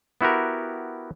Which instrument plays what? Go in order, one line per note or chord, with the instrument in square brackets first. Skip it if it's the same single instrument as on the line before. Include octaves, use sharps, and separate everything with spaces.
[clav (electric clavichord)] B3 E4 F#4 G4 A#4